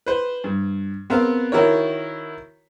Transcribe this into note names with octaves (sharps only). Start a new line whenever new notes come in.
B4 C5
G2
B3 C4 A#4 F5
D#3 E4 F#4 A#4 C#5